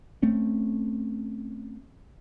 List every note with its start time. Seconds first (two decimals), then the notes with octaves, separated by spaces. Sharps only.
0.23 A3 C4 C#4